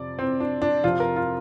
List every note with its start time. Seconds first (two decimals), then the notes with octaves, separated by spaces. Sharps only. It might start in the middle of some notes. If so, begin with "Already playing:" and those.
Already playing: F2 C3 F3 D5
0.19 C4
0.40 D4
0.62 D4
0.84 F2 C3 F3 F4
1.00 A#4
1.16 F4